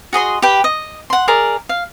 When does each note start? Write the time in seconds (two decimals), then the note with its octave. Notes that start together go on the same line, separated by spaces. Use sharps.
0.13 F#4 G#4 D#5 C6
0.42 G4 B4 G5
0.64 D#5
1.10 F#5 C6
1.28 G#4 A#4 D5
1.69 F5